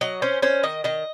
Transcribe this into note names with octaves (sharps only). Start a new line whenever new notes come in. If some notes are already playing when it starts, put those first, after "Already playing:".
F#3 D#5
C#4 C5
C#4 C5
D#3 D#5
D#3 D#5